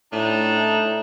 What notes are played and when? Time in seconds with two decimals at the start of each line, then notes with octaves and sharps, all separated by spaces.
0.13 A2 D4 D#4